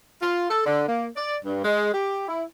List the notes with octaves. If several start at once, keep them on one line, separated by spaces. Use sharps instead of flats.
F4
A4
D3
A#3
D5
G2
G#3
G4
E4